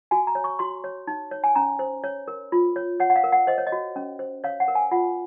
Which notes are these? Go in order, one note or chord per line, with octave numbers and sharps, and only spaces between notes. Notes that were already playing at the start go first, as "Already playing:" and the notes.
F#4 G#5
A#5
C#5
C#6
F#4 C6
C#5
D#4
C#5
G#5
C#4 A#5
C5
C#5
A#4
F4
C#5
C#5 F#5
F#5
F5
A#4
F#5
C5 D#5
C#5
D#5
F#4
C#4
C5
C#5 F5
F#5
A#4
G#5
F4 F#5